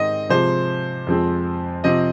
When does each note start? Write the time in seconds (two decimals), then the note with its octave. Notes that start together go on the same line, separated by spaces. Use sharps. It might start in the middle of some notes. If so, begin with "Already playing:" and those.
Already playing: G#2 D#3 C4 D#5
0.29 C3 F3 G#3 C5
1.07 F2 F3 G#3 C4
1.84 C3 F3 C4 D#5